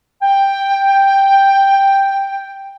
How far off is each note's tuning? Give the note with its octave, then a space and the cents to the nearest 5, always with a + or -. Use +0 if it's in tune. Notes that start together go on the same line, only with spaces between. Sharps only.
G5 +5